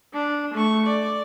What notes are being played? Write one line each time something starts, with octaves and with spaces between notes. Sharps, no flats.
D4
A3 C#6
D5